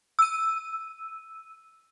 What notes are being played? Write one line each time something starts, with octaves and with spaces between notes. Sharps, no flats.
E6 D#7